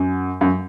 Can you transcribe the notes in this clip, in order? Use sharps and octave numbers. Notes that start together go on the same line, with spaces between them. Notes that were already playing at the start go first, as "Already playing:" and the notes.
Already playing: F#2
F#2